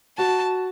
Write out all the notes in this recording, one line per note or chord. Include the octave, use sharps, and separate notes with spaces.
F#4 A5